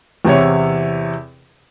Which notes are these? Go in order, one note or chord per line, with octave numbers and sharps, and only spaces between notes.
E2 C3 E4 C#5